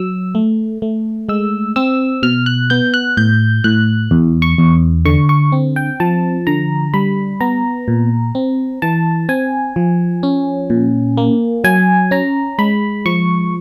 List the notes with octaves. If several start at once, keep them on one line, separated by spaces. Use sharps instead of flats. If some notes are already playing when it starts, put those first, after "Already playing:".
Already playing: F#3 E6
A3
A3
G#3 E6
C4 E6
B2 F6
F#6
B3 G6
F#6
A2 G6
A2 F#6
E2
C#6
E2
D3 C#6
C#6
C4
G5
F3 A5
D3 A#5
G3 B5
B3 A#5
A#2
C4
E3 A5
C4 G#5
F3
C#4
A#2
A#3
F#3 G#5
C#4 A#5
G#3 B5
F3 C#6